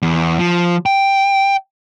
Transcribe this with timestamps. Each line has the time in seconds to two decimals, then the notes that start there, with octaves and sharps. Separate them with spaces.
0.02 E2
0.39 F3
0.86 G5